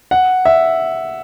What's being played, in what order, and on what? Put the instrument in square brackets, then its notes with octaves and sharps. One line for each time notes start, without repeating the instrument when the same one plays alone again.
[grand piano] F#5
E5